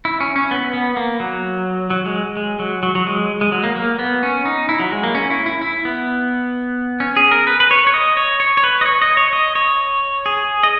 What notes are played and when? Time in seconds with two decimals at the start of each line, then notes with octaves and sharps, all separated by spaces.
0.05 E4
0.20 C#4
0.36 C#4
0.51 B3
0.74 B3
0.97 A#3
1.20 F#3
1.90 F#3
2.06 G#3
2.37 G#3
2.59 F#3
2.83 F#3
2.95 F#3
3.07 G#3
3.41 G#3
3.52 F#3
3.64 A#3
3.76 A#3
3.99 B3
4.23 C#4
4.45 D#4
4.69 E4
4.80 F#3
4.92 G#3
5.03 A#3
5.15 C#4
5.30 E4
5.46 E4
5.62 E4
5.85 B3
7.00 C#4
7.17 G#4
7.31 A#4
7.47 B4
7.60 B4
7.71 C#5
7.87 C#5
7.94 D#5
8.17 C#5
8.40 C#5
8.57 C#5
8.64 B4
8.81 D#5
8.86 C#5
9.02 D#5
9.17 C#5
9.33 D#5
9.55 C#5
10.26 G#4
10.63 D#5